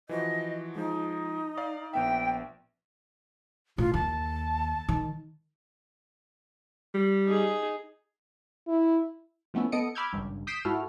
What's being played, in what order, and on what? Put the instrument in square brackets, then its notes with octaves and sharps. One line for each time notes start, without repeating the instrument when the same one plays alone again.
[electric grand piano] E3 F3 F#4 [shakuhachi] D#5
[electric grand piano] F3 G#3 [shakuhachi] D#4
[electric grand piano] D5 F5 D6
[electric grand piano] A#1 B3 E5 [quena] G5
[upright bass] A2 [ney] F4
[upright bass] D#2 [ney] A5
[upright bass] D#3
[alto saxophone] G3
[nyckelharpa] D#4 G#4
[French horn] E4
[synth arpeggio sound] F3 A3 B3 C#4 E4
B3 A4 D#5 D#6 C#7 D7
B5 D6 E6 F6 G6 G#6
G#1 C#2 G2
D#6 G6 B6 C7 D7 E7
G#2 E4 F#4 A4 F6